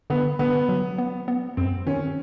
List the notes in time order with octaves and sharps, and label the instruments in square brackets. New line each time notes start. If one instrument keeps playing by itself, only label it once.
[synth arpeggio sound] D3 [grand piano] B3
[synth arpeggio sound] D3 [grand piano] B3
[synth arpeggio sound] F#3
B3
B3
[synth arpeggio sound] F#2 [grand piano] C4
[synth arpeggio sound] D#3 [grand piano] C#4